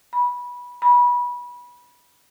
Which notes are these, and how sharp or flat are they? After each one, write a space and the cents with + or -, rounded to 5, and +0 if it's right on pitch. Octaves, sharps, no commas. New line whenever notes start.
B5 -20
B5 -25